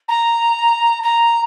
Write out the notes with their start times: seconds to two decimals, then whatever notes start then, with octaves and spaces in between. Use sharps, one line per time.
0.09 A#5
1.03 A#5